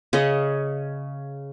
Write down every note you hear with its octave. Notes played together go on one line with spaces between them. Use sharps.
C#3 C#4 D#5